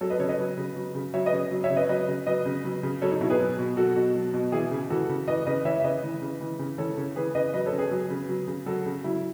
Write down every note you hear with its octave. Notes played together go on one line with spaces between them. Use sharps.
F#3 A4 C#5
B4 D#5
C#3 A4 C#5
B4 D#5
F#3
C#3
F#3
C#3
F#3 C#5 E5
B4 D#5
C#3
F#3
C#5 E5
C#3
B4 D#5
F#3 B4 D#5
C#3
F#3 B4 D#5
C#3
F#3
C#3
F#3 A4 C#5
D#4
B2 E4
G#4 B4
F#3
B2
F#3 F#4 A4
B2
F#3
B2
E3 E4 G#4
C#3
E3 F#4 A4
C#3
E3 B4 D#5
C#3 B4 D#5
E3 C#5 E5
E5
C#3 B4 D#5
E3
C#3
E3
C#3
E3 A4 C#5
C#3
E3 G#4 B4
C#3 B4 D#5
F#3 B4 D#5
A4 C#5
C#3
G#4 B4
F#3
C#3
F#3
C#3
F#3 F#4 A4
C#3
F#3 E4